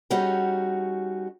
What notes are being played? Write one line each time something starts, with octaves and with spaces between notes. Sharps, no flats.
G3 C#4 D#4 F#4 G#4